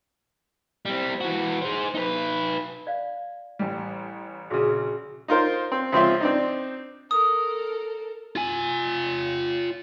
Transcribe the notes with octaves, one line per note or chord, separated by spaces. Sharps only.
G3 C4
E3 F#4
G#4 C5
D#4 B4
D5 F5
A1 G3
A#1 C#3 F#4 G#4
D#4 F4 A#4 C5
C4
C#2 F3 C4 F4 E5 C6
C4 D4 D#4
A4 A#4 D#6
F4 G#5